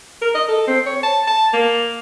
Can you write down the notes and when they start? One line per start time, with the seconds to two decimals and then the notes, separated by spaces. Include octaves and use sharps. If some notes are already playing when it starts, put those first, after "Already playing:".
0.22 A#4
0.35 D#5
0.48 A4
0.67 C4
0.86 C#5
1.03 A5
1.27 A5
1.54 A#3